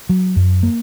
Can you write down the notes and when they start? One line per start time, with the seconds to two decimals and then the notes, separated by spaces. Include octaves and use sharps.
0.09 F#3
0.36 F#2
0.63 A#3